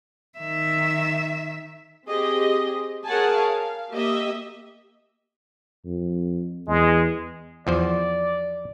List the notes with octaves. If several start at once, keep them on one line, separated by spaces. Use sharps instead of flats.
D#3 E5
C4 G4 G#4 D#5
G#4 A#4 C#5 F#5 G#5 A5
F5
A#3 G4 D#5 E5
F2
E2 G#3
E2 F3 C5 D5